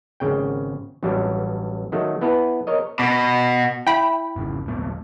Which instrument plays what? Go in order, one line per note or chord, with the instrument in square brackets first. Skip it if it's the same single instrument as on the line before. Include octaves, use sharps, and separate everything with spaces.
[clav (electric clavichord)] G#1 C#3 G5
A1 G2 F#3 G3
D#3 F#3 A3
B3 E4 B4 A5
A#4 C#5 D#5
[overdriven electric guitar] B2
[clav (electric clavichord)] E4 [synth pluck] G5 B5
[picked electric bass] G#1 C#3
D#1 A3 B3